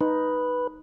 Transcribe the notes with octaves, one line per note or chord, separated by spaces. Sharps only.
D#4 B4